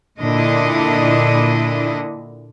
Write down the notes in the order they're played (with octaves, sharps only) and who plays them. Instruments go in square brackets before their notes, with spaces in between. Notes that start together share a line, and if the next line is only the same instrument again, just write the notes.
[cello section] A#2 D3 D4 E4 D#5